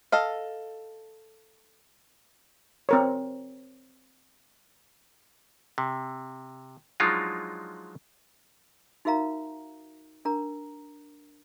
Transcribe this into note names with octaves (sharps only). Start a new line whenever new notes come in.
A4 D#5 F5
C4 A#4 C#5
C3
F3 F#3 G#3 D4 D#4 F4
D#4 F#4 A#4 E5 F5 A#5
D4 A#4 A#5